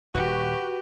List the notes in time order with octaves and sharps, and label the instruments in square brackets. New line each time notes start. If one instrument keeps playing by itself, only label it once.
[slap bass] D#1 G#1 [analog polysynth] F#4 [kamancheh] G4 [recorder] B4